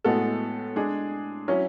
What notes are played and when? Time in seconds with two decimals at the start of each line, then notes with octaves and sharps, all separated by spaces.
0.04 A2 G#3 B3 F#4 A4
0.76 G#3 D4 G#4
1.48 F#3 C#4 E4